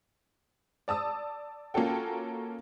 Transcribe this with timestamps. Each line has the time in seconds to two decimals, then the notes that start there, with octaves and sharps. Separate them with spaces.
0.88 D5 A5 D#6 E6
1.74 A#3 C#4 F4 F#4 A4 G5